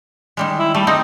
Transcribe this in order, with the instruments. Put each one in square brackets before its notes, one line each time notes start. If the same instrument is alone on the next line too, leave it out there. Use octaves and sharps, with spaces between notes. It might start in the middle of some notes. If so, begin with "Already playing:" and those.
[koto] D#3 G3 G#3
[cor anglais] E4
[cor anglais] G3 [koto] A3
[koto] C4 D#4 [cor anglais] D#5